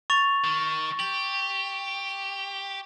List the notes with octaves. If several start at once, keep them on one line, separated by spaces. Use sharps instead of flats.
C#6 A6 F7
D#3
G4 F#7